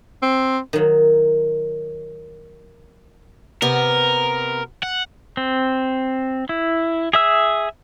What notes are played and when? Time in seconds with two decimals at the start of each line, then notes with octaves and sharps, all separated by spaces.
0.23 C4
0.73 D#3 F#3
3.62 C3 B3 A#4
4.83 F#5
5.37 C4
6.49 E4
7.13 G#4 E5 E6